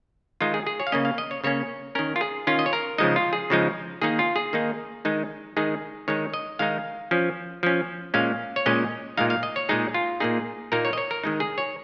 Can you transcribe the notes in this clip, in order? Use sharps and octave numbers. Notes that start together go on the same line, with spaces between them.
D#3 G#3 D#4 F4
G#4
G#4
C#5
F5
C#3 A#3 C#4 D#5
F5
D#5
C#5
C#3 A#3 C#4 C#5
D#3 C#4 A#4
F4
G#4
D#3 C#4 F4
D#5
C#5
A#4
C#3 F3 G#3 D#4 D#5
F4
G#4
C#3 F3 G#3 D#4
D#3 A#3 D#4 G#4
F4
G#4
D#3 A#3 D#4
D#3 G#3 D#4
D#3 G#3 D#4 G#4
D#3 G#3 D#4 C#5
D#5
D#3 G#3 D#4 F5
F3 C#4
F3 C#4
A#2 G#3 C#4 F5
C#5
A#2 G#3 C#4 D#5
A#2 G#3 D#4 F5
F5
D#5
C#5
A#2 G#3 D#4 G#4
F4
A#2 A#3 D#4 G#4
A#2 A#3 D#4 A#4
C#5
D#5
C#5
A#4
D#3 G#3 D#4
G#4
C#5